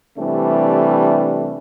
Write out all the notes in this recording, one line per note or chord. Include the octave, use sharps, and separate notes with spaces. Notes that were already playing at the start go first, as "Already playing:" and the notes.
C3 E3 G3 A3 D4